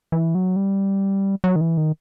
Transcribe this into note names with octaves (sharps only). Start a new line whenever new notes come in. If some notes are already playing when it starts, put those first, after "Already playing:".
E3
F#3
G3
F#3
D#3
E3
D#3